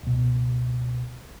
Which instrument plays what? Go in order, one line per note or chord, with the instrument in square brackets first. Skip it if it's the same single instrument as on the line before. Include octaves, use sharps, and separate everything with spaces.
[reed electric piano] C#2 B2